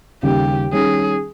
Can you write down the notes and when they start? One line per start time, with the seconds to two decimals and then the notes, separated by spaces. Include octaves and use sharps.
0.22 D#2 C#3 G3 G4
0.72 D#3 G3 C#4 G#4